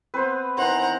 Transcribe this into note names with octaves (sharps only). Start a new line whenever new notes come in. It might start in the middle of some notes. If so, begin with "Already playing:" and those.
B3 C4 B4 C5
D#3 E3 C5 F#5 A#5